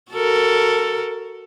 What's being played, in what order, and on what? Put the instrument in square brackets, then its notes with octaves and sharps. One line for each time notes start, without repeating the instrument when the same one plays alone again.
[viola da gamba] F#4 A4 A#4